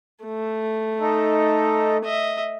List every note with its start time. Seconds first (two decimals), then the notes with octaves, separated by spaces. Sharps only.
0.25 A3
1.00 D#4 A4
2.05 D#5 E5